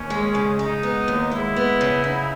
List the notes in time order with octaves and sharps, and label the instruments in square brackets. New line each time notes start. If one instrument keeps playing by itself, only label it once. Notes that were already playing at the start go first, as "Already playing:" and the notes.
Already playing: [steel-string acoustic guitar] D#2 [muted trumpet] C#4
[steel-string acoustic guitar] G#3
C#3
[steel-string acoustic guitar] G#3 [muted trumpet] D#4
[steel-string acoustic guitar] B3
D#2
[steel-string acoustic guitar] G#3 [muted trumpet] E4
[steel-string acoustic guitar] B3
C#3
D#4